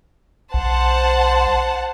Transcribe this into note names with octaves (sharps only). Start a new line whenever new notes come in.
B1 C5 F#5 A5